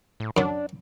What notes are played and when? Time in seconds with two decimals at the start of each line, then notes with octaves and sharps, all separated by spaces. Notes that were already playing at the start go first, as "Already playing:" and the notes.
0.20 A2
0.37 F#2 F#3 D4